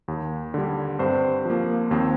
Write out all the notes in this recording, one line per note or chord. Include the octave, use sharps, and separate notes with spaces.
D#2
D3 G3
G2 C4 C5
F3 A#3
D#2 C4 C5